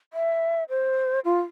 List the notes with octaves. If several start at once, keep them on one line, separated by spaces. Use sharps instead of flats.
E5
C5
F4